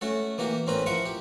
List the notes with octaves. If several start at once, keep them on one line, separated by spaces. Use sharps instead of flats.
A3 C#4 F#4 A4
E3 A#3 F#4 G4
A1 C4 C#4 A#4 B4 B5
F3 E4 A#4 F#5 C#6
G4